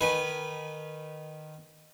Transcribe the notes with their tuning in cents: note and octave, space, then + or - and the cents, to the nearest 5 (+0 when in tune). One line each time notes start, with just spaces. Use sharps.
D#3 -15 B4 -10 G#5 +0